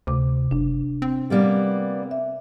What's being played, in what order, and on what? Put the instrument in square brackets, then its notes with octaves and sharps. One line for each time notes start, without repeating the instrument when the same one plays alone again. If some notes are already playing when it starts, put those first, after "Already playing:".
[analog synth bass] D2 [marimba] C3 D6
[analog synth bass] F#1 [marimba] D4
[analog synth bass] C4
[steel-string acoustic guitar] G3 A#3 B3
[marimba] E5